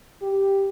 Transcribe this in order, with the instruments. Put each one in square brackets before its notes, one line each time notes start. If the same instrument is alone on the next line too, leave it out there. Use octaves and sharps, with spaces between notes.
[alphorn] G4